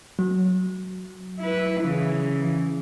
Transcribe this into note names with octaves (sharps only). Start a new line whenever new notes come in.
F#3
E4 B4
C#3 E3